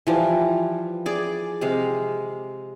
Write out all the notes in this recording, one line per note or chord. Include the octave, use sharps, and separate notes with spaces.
E3 F3 G3
G#4 D5
C3 G#3 F5